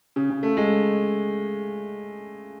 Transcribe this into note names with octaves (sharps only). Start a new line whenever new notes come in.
C#3
C#3
A3
G#3